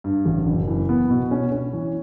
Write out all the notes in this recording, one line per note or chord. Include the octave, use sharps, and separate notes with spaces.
G2
A1
F#1
E3
B3
B2
C#4
C#4
E3